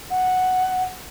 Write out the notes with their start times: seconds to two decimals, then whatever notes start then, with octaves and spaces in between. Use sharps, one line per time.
0.10 F#5